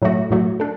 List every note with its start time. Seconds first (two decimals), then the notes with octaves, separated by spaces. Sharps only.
0.02 A2 F#3 A3 F#4
0.31 A2 F#3 A3 F#4
0.60 D4 A4